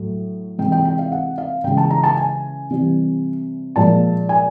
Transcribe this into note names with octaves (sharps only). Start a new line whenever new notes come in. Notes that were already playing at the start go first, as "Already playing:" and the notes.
Already playing: A2 F#3
C3 E3 G#3 G5
G5
G5
F5
F#5
F5
C#3 E3 G#3 G5
A5
A#5
A5
G#5
C3 E3 G3
A#2 F3 G#3 A5
G#5